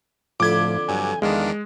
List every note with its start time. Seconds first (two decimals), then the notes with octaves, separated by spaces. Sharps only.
0.40 F2 A2 D3 F3 B5 D6 G#6
0.88 G2 F#3 G#5
1.22 E2 D#3 G#3 D4 F5